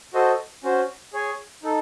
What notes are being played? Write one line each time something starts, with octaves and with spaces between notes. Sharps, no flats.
F#4 A4 C5 D#5
C#4 F#4 C5
G#4 C#5 G#5
D#4 A4